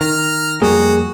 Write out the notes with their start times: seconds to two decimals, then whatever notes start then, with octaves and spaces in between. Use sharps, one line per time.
0.01 D#3 A#5 F6
0.62 F2 G3 A#3 F#4 G#4